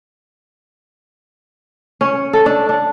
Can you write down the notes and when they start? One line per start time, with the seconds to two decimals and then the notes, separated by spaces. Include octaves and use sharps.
2.01 C#4
2.33 A4
2.46 D4
2.69 D4